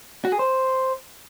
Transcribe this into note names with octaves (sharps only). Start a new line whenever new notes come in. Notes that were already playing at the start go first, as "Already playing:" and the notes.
F#4
G#4
C5